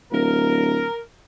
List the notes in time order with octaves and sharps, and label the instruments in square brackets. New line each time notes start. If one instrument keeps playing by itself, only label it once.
[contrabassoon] D1 [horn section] A#4